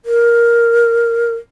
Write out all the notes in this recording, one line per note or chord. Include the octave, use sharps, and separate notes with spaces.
A#4